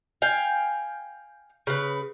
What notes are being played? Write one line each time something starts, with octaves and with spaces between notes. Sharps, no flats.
F5 G5 G#5
C#3 B4